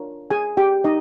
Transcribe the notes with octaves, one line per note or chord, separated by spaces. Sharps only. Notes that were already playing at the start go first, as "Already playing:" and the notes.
Already playing: D4 F4 A#4 C#5
G#4 G#5
G4 G5
D#4 D#5